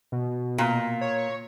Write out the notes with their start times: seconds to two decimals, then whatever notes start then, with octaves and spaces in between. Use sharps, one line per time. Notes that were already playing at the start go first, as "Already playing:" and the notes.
0.12 B2
0.58 A#2
1.01 C#5